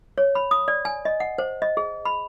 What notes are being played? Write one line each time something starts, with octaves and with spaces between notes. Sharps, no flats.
C#5
B5
D#6
D5
G#5
D#5
F#5
C5
D#5
G#4
B5